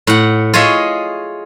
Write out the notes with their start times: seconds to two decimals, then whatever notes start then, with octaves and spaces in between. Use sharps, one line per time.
0.07 A2 F#5
0.54 F4 G#4 C#5 D#5 E5